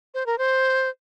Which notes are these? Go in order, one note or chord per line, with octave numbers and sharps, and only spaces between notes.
C5
A#4
C5